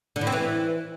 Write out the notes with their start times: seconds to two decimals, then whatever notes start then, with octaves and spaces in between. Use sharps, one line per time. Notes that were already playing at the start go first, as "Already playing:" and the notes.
0.16 D3
0.21 A2
0.27 C4
0.32 E3